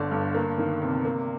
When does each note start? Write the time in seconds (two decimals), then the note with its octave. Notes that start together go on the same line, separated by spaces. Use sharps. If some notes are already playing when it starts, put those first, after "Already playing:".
Already playing: G1 D3 D5
0.11 G2
0.35 A#3
0.58 D#3
0.82 C3
1.05 A#3